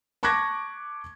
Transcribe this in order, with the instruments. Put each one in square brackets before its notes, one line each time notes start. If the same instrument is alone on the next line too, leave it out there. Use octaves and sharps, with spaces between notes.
[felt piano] A5 C#6 D6 F#6 G#6 A#6